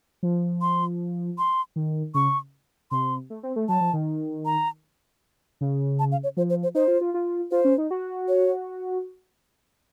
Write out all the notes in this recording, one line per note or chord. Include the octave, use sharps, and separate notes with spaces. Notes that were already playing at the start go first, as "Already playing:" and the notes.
F3
C6
C6
D#3
C#3 C#6
C3 C6
A3
C4
A3
F#3 A5
F3
D#3
A#5
C#3
A5
F5
C#5
F3 C5
C5
C5
D#4 C5
F4
F4
F4
F4 C5
C#4
D#4
F#4
C#5